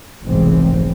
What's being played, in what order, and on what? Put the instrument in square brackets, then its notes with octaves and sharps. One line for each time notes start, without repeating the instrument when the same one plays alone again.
[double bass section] F1 B1 G#2 E3 G#3 C4